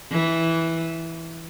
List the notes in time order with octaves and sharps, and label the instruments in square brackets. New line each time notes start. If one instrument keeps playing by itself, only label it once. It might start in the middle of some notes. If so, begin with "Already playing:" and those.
[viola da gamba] E3